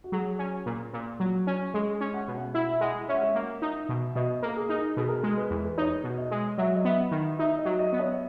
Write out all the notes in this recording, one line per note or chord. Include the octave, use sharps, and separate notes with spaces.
F#4
F#3 G#4
C#4
A#2
A#2
F#3
C#4
G#3 G#4
C#4
F#5
B2
F#5
E4 E5
G#3 F#5
C#4 E5
F#5
E5
A#3
D#4
B2
B2 D#5
A#3 A#4
G#4
D#4
B2 G#4
A#4
G#3 G#4
B4
E2
B4
D#4 C#5
B2
D#5
G#3
F#3 E5
D#5
B3 E5
D#3
D#4 E5
D#5
F#3
D#5
B3
C#5